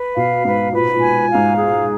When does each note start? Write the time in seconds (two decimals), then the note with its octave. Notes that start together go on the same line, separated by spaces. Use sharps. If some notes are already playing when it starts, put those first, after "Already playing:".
Already playing: B4
0.17 B2 F5
0.45 G#2 B4
0.72 A#2 B4
0.93 A#2
1.00 G#5
1.28 F5
1.35 G#2
1.56 G#4